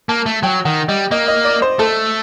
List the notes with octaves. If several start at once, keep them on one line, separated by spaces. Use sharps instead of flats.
A#3 A5
A3
F#3 G5
D#3 F#5
G3 D#5
A#3 D#5
D#5
D5
C5
A3 A4